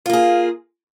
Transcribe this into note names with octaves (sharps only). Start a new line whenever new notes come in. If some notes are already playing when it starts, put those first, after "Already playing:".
A#3 F4 G#4